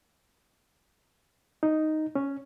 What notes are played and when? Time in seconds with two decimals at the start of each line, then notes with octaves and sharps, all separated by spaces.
1.63 D#4
2.15 C#4